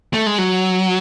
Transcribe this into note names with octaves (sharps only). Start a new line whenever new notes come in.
A3
G#3
F#3